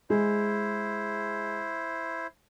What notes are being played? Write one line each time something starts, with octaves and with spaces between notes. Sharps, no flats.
G#3 E4 C5